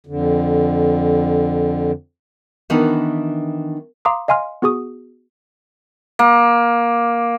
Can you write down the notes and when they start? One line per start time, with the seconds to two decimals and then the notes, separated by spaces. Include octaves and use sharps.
0.07 F2 D3
2.70 D#3 E3 B3 D4 D#4
4.05 F5 A#5 C6 D6 D#6
4.28 D#5 F5 G#5 C6 F6
4.62 B3 F#4 G#4 C#6 D#6
6.19 A#3